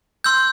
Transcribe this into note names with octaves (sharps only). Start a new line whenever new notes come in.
C6 E6 G6